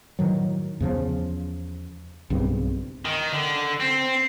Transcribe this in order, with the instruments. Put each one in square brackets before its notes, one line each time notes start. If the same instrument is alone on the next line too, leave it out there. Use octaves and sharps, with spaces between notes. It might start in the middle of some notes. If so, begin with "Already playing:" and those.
[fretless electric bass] A2 D#3 F#3
E2 C#3 F3
B1 G2 C#3 C4
[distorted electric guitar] D#3
D3
C4